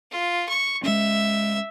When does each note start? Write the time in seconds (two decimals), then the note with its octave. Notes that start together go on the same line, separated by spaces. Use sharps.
0.11 F4
0.48 C#6
0.83 G#3 B3 C#4 E5